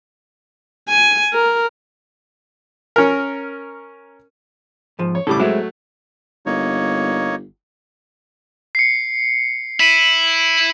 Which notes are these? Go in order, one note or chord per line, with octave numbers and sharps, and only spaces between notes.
G#5
A#4
C#4 A#4
G#2 F3
C#5
B1 A2 C#3 G3 A4 D6
F#3 G#3 A3 C4 E4
G1 A#3 D#4 C#5
C7 C#7
E4 B6 D#7 F#7